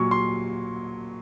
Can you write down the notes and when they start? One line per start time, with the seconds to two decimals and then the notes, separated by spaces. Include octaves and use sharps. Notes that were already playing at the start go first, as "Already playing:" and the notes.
Already playing: A#2 F#3 C#6
0.11 C6